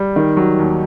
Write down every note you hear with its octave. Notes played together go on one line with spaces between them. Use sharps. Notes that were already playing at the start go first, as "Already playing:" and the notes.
Already playing: G3
D#3
F#3
D#2